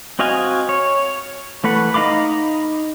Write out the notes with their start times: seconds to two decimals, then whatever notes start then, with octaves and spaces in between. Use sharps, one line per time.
0.19 C4 F#4 D#5 F5 G#5
0.69 C#5
1.64 E3 A3 B4 F#5
1.94 D#4 D#5 F5 B5 D6